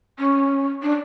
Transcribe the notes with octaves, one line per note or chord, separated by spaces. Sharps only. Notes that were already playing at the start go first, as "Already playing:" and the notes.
C#4
D4